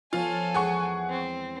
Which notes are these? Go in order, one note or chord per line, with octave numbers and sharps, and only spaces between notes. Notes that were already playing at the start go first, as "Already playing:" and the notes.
F3 B3 F4 A4 C#5 G#5
E2 G#3 G#4 F#5 C#6
C4